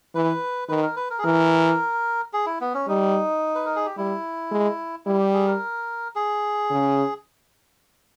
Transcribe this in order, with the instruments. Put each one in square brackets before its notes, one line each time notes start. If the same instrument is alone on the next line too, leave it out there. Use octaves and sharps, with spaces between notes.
[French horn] E3 [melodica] B4
[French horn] D#3 [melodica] B4
[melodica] A#4
B4
A#4
G#4
[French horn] E3 [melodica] A#4
[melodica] G#4
E4
B3
C#4
[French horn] G3 [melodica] D#4
[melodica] B4
A#4
G#4
G4
[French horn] G3 [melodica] E4
[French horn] G#3
[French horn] G3 [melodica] E4
[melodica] G4
G#4
A#4
G#4
[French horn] C#3